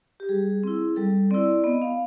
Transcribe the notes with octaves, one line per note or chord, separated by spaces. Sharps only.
G4
G3 G#4
C4 E4
G3 A4
C4 E4 D5
B3 D#5
F5